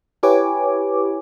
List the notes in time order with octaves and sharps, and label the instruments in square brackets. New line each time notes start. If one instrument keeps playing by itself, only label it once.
[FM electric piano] E4 G4 B4 C#5 G#5 D6